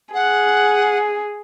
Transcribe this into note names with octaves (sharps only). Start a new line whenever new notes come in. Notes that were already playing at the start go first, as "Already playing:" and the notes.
G#4 F#5